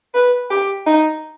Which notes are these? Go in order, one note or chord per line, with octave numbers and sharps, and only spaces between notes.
B4
G4
D#4